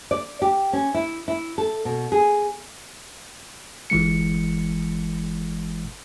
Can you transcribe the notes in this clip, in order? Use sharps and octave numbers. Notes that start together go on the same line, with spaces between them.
D5
G4
C#4
E4
E4
A4
B2
G#4
G1 E3 G#3 C#7